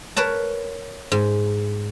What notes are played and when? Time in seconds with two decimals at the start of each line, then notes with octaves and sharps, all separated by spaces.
0.17 A#4 B4 C#5 A5
1.12 G#2